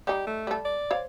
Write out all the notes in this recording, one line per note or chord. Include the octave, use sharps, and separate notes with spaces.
G3 D#4 G4
A3
G3 A4
D5
C5 C#5 F5